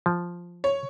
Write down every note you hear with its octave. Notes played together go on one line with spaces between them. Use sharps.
F3
C#5